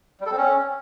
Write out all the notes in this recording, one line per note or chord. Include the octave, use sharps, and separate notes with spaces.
G3
A4
C4
C#4